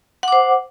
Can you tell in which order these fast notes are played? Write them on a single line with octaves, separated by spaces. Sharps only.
F#5 D6 C5